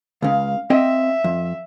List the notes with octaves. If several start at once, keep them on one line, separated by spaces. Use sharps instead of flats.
C#2 C#3 F5
C4 D#5 E5 G5
F2